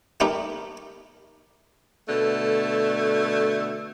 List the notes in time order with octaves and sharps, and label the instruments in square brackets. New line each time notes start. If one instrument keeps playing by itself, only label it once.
[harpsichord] A3 B3 D#4 G4 A#4
[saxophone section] B2 D3 A3